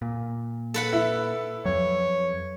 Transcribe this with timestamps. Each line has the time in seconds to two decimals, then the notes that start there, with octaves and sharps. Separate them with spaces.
0.02 A#2
0.74 A4 B4 F#5
0.93 E4
1.65 F2 F#3 C#5